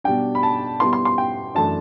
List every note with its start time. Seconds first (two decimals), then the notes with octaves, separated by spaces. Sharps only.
0.04 B2 G3 D4 G5
0.35 B5
0.43 A5
0.80 B2 G3 B3 E4 C6
0.93 C6
1.05 C6
1.18 G5
1.55 F#2 E3 A3 D4 A5